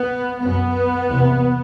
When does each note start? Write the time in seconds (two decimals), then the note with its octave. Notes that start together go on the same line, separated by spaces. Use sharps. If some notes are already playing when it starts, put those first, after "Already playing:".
Already playing: B3
0.44 F#2 B3
1.07 E2 C3